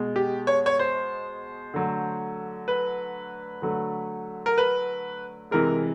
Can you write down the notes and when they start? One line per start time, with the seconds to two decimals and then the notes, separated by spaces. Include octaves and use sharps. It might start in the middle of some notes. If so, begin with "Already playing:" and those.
Already playing: B2 G#3
0.16 G4
0.47 C#5
0.66 C#5
0.79 C5
1.74 D3 F#3 A3
2.68 B4
3.62 D3 F#3 A3
4.46 A#4
4.58 B4
5.51 C3 E3 G#3 A#4